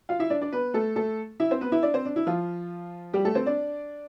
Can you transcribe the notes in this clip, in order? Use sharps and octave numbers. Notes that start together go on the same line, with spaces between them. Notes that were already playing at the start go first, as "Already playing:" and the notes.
F4 F5
E4 E5
D4 D5
D4 D5
B3 B4
A3 A4
A3 A4
E4 E5
C4 C5
B3 B4
E4 E5
D4 D5
C4 C5
D4
E4
F3 F4
G3 G4
A3 A4
C4 C5
D4 D5